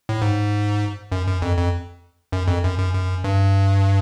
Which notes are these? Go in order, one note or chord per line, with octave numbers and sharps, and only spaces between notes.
A2
G#2
F#2
F#2
F2
F2
F#2
F2
F#2
F#2
F#2
G2